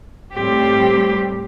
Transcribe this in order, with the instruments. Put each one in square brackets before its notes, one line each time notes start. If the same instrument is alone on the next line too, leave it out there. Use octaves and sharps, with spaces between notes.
[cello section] A2 G3 C4 G4